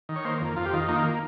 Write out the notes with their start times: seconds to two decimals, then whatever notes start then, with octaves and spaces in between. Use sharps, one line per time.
0.09 D#3
0.16 C#5
0.25 A#3 C5
0.41 F2
0.56 F2 F4
0.65 G4
0.73 D#3 F4
0.89 A#3 D#4
0.96 F4
1.04 D#4